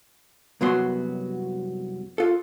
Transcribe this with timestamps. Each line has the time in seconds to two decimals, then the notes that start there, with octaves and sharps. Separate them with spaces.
0.61 C2 F#2 F#3 B3 F#4 C6
2.18 F4 A4